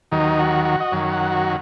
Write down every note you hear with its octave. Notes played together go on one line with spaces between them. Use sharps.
D#2 D#3 F#3 D#4
F#4
F#4
D#5
F#2 D#3 F#3 C#5
F#5
F#4